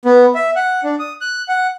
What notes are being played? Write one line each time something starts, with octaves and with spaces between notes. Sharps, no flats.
B3
E5
F#5
D4
D#6
F#6
F#5